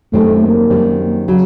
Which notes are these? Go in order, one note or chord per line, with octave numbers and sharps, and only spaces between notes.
F#2 D#3 G3 A3 C4
A#3
F#2 D#3 G3 C4
C#3 F#3